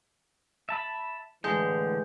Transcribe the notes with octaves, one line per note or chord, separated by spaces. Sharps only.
E5 A5 B5
A2 D3 E3 G#3 G6